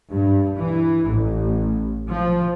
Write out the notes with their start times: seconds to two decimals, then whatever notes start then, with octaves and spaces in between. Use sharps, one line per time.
0.12 G2
0.58 E3
1.09 A1
2.09 F3